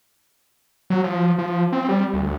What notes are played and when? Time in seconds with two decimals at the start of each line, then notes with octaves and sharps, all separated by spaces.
0.90 F#3
1.04 F3
1.38 F3
1.72 C4
1.89 G3
2.14 D2